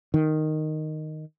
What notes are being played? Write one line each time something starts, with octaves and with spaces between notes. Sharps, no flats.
D#3